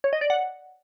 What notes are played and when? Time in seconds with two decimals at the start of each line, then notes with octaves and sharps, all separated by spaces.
0.04 C#5
0.13 D#5
0.21 D5
0.30 F#5